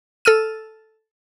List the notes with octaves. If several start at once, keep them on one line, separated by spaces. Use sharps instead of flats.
A4 E6 F6 D#7